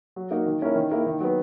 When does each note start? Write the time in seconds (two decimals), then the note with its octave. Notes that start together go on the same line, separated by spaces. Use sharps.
0.16 F#3
0.31 A#3 D#4 F#4 A#4
0.46 D#3
0.62 A#3 C#4 E4 A#4
0.76 D#3
0.91 A#3 E4 A#4
1.06 D#3
1.20 F#3 B3